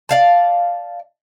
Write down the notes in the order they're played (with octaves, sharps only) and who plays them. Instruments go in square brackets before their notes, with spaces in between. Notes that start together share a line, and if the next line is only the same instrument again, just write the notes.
[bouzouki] D5 F5 A5